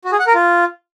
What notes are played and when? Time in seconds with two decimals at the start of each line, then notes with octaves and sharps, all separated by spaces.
0.05 F#4
0.12 G#4
0.19 F#5
0.27 A#4
0.34 F4